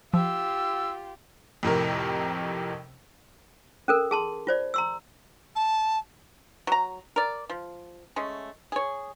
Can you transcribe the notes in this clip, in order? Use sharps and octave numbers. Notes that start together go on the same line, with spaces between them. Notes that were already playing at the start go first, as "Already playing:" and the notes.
F3 F4 G4 E6
F2 A2 C3 A#4
C#4 A4 A#4
G#4 A5 C6
F4 C5 D5
A#5 C6 E6
A5
F#3 A#5
A#4 D5
F3
G#3 A3 C#4
G#4 C#5